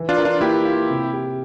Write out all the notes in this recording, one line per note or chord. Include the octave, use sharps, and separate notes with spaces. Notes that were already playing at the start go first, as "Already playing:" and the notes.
Already playing: E3
D4 F4
A#4
D4 F4
A#3 E4 G4
F4
C3
G4